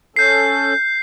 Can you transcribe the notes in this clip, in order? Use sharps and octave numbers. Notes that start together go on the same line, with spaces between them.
C#4 A4 G6 C7